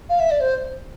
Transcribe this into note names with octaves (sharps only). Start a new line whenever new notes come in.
F5
E5
D5
C5